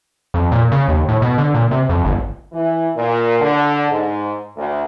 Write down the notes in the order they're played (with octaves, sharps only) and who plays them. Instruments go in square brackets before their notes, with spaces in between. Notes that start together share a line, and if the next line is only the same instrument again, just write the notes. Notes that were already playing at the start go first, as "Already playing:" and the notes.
[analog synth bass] F2
A#2
C#3
D#2
A2
B2
D3
A#2
C3
F2
G1
[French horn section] E3
A#2
D3
G#2
D2